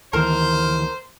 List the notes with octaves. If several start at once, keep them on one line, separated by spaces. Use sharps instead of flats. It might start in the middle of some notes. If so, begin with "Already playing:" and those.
D2 D#3 E3 A#4 C5